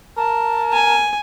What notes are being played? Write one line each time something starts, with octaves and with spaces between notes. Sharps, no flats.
A#4 A5
G#5